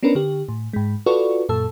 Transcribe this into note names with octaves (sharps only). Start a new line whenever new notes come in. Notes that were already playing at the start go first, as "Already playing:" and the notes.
B3 C#4 D4 A#4 B4
D3 G4
A2
G#2 G#3
F4 F#4 A4 B4 D5 C#6
F#2 A#2 A4 A5 E6